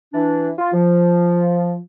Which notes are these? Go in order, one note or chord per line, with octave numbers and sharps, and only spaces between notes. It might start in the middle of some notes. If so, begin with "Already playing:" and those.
E3 D4
F4
F3